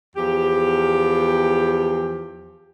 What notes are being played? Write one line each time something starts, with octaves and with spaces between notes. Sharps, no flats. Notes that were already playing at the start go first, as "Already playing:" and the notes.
E2 F3 G4